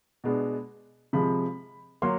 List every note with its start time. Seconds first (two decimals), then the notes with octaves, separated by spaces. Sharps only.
0.24 B2 G#3 B3 D4
1.13 C3 F3 G#3 B5
2.02 F#3 A#3 C6